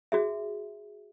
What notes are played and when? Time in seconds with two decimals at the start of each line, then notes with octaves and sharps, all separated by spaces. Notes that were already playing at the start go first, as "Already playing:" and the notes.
0.12 F#4 G#4 E5